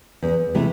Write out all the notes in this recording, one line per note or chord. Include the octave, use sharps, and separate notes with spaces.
E2
C3 E3 A3